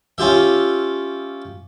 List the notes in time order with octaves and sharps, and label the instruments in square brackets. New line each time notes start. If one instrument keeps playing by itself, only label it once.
[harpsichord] C#4 F4 G4 E5